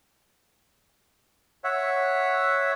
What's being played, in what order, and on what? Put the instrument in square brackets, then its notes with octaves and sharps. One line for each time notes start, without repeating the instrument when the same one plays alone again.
[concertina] C#5 E5 F#5